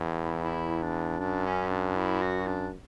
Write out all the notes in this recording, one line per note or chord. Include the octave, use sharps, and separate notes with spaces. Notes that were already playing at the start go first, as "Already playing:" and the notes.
Already playing: E2
E4
E4
D4
F#2 D4
C#4
D4
E4
F#4
D4